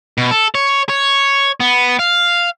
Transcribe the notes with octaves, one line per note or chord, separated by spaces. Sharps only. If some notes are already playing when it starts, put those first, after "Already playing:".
B2
A4
C#5
C#5
B3
F5